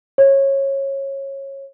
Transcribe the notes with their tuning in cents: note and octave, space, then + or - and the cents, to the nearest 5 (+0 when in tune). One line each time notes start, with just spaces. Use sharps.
C#5 -20